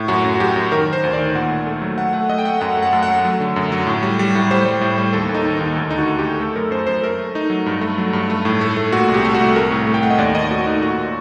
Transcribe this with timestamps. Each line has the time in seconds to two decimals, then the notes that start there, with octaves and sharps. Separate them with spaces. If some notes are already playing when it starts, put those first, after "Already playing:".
Already playing: A2
0.08 F#2 F#4
0.25 F#2
0.35 F#4
0.40 F#2 G4
0.56 F#2
0.72 D#3 A#4
0.87 D#3
0.93 C5
1.03 D2
1.13 D5
1.19 D#3
1.35 A#2 F#5
1.51 A3
1.67 A3
1.82 F#3
1.98 A3 F#5
2.13 A3 F#5
2.29 A3 D#5
2.38 G5
2.45 A3 F#5
2.61 F#2 F#5
2.77 A3
2.82 F#5
2.93 F#2
3.03 F#5
3.08 A3
3.25 F#3
3.40 D3
3.56 F#2
3.72 F#3
3.87 A2
4.03 G3
4.19 G3
4.35 A2
4.51 G3 C5
4.66 G3
4.81 A2
4.98 G3
5.13 D#2 A4
5.29 D#2
5.34 D#4
5.46 D#3
5.56 D#2 D#4
5.77 D2
5.90 D3 D#4
5.98 F#4
6.08 A3
6.19 A3 G4
6.40 A3 A4
6.56 F#2 A#4
6.71 F#2 C5
6.87 F#2 C5
7.02 A3 A#4
7.19 A3
7.35 A3 D#4
7.50 F#3
7.66 G2
7.81 A3
7.98 F#3
8.13 G2
8.30 A3
8.45 A2
8.61 A3
8.77 A3
8.92 A#2 F#4
9.08 C2
9.14 G4
9.25 A3
9.35 F#4
9.40 C2
9.56 A3 A#4
9.71 A2
9.87 A3
9.94 G5
10.03 A3 F#5
10.10 D#5
10.18 D#2 D5
10.35 D#2 D#5
10.51 A3 F#4
10.66 D#2 D#4
10.82 A#2 F#4
10.98 A#2